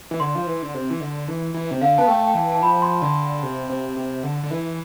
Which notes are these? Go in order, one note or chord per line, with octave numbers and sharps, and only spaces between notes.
E3
D3 C6
F3
E3
D3
C3
E3
D3
E3
E3
C3
D3 F5
B3 A5
A3 G5
G5
E3 A5
A5
F3 B5
C6
D3 C6
C3
C3
C3
D3
D3
E3